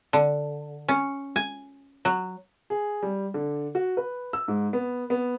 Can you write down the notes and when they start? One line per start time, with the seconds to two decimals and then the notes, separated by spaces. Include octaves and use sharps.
0.13 D3
0.88 C#4
1.36 G#5
2.05 F#3
2.70 G#4
3.03 G3
3.34 D3
3.75 F#4
3.97 B4
4.33 E6
4.48 G#2
4.73 B3
5.10 B3